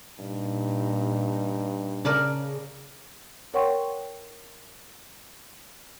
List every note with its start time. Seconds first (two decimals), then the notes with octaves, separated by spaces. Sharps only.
0.20 G2 A#2 D#4
2.05 C#3 A#4 D5 A5
3.54 A#4 C#5 F#5 G5 C6 C#6